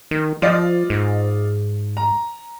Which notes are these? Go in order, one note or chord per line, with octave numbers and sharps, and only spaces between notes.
D#3
F3 F4 D5 D#5
G#2
A#5